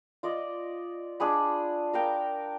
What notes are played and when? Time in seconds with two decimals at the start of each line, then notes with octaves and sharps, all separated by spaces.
0.23 F4 D5 D#5
1.20 D4 F4 G#4 B5
1.93 A#4 F5 G5